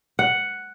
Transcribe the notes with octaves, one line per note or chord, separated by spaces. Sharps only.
F#5